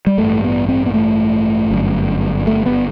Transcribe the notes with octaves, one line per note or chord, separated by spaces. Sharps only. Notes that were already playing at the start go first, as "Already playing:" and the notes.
G3
A1 G2 A3
B3
C4
B3
A3
G1 F#2
A3
B3